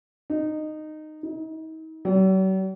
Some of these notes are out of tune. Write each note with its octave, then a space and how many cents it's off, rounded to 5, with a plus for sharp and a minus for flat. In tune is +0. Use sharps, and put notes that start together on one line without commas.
D#4 -15
D#4 +40
F#3 +45